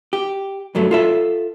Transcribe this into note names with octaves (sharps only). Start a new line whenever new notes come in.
G4
G2 F#3 A3
F4 A4 E5